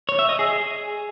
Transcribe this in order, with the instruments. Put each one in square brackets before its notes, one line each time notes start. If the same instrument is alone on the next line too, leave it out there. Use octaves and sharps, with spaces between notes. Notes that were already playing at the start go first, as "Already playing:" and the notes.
[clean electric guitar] C#5
E5
D#5
G#4